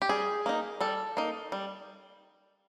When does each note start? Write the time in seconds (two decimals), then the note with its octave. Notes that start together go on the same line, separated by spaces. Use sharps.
0.02 G4
0.09 G3 G#4
0.46 A#3 D#4
0.80 G3 A4
1.17 A#3 D#4
1.52 G3